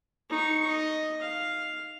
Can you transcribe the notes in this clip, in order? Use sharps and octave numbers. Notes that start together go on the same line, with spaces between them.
D#4 C#6
D#5
F5